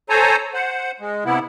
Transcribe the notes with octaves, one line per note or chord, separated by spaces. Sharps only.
A4 C5 C#5 G#5 A#5
C5 F#5
G#3
C3 B3 E4